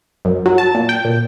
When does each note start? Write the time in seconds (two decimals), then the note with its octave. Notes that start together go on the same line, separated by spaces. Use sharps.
0.25 F#2
0.46 F#3
0.58 A5
0.74 A#2
0.89 G5
1.05 A#2